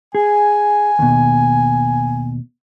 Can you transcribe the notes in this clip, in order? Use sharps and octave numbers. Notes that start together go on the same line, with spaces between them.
G#4 G#5
D#2 B2